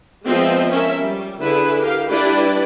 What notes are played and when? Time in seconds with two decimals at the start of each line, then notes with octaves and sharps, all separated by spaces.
0.26 F3 G#3 B3 C4 D#5 E5
0.71 C#4 A#4 E5
1.01 G3
1.41 D3 E4 G#4 B4 E5
1.80 G4 A#4 F5
2.10 G3 D4 E4 G4 B4 D5